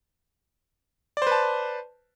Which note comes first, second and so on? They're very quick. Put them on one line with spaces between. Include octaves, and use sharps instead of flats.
D5 C5 B4 A5